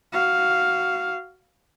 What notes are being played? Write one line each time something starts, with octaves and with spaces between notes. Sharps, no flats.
F#4 F5